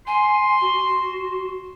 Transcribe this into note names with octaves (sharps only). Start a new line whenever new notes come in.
G#5 C6
F#4